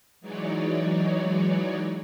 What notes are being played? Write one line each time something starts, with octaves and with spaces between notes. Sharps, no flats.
E3 F#3 G#3 D#4 C#5 D5